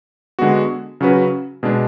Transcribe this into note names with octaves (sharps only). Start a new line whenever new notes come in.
D3 G#3 B3 F#4
C#3 F#3 C#4 F#4 B4
B2 G#3 D4